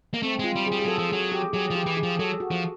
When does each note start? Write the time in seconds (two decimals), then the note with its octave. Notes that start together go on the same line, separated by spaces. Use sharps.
0.14 A#3
0.22 A3 C4
0.39 G#3 F4
0.55 G3
0.66 G#4
0.72 G3
0.79 G#4
0.85 F#3 A4
0.99 F3
1.10 F#3 G#4
1.32 G4
1.53 F#3 G#4
1.70 F3
1.75 G4
1.86 E3
1.97 G#4
2.03 F3
2.19 F#3 A4
2.40 F#4
2.51 F3